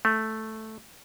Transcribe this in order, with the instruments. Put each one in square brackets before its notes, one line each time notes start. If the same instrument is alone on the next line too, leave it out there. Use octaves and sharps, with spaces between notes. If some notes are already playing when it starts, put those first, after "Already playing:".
[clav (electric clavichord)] A3